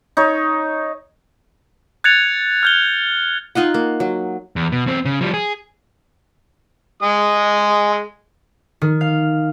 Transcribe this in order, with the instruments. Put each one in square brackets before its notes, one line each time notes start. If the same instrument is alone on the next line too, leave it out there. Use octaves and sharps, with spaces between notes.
[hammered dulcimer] D#4 C#5
[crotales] F#6 G#6 A6 C#7 F7
F6 G6 G7
[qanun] D#4 F4 D#5 F#5
A#3
F#3
[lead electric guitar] E2
B2
E2 C4
C#3
F3 G3
G#4
[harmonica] G#3 D#6
[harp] D#3
F5